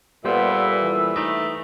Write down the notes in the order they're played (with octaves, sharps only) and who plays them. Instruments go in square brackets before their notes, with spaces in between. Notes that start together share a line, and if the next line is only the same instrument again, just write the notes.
[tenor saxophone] A#2 [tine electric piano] G3 C5 [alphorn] B3 [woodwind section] A4 E5
[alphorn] E3
[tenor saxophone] A3 [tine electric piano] D#4 D#5